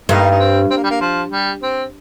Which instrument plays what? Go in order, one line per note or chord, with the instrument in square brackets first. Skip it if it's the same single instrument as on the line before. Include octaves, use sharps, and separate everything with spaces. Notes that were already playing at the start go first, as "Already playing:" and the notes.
[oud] G2 [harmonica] A#3 D#4
[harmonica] D#4
C4
C4
A#3
G3
A#3
F3
G3
C4